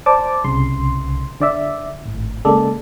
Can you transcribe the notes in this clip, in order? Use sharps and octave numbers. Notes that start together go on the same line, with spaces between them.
C5 D5 A5 D6
C2 C#3 C6
D3 D5 E5
G#1 A2
C#3 G#3 A#3 A4 D5